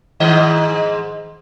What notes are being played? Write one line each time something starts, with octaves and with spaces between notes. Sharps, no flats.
G#2 D#3 D#5